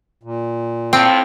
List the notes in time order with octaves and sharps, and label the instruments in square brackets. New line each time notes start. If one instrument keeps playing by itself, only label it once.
[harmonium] A#2
[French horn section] A2 F3 [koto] C4 [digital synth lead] G5